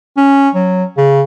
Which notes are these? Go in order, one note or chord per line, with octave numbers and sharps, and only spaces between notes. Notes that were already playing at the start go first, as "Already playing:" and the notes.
C#4
F#3
C#3